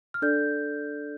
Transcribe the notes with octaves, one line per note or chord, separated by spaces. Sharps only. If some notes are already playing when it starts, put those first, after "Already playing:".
F6
D4 A4 D5 G6